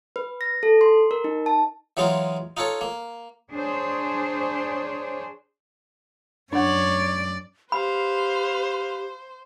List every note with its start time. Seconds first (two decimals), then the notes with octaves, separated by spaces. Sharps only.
0.16 B4
0.41 A#6
0.63 A4
0.81 C6
1.11 A#4
1.24 D#4
1.46 A5
1.97 E3 F#3 G#3 C#4 D#4 F4
2.57 D#4 F4 A4 C#5
2.81 A#3
3.52 D4 G#4 C5 C#5
6.53 F#2 D4 C#5 D5 F#5
7.72 G4 B4 C5 F5 B5